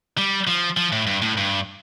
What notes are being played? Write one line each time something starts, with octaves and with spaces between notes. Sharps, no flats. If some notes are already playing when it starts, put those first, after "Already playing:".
G3
F3
F3
A2
G2
A2
G2